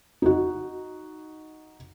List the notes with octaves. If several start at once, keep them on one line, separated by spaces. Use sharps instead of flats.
D#4 F#4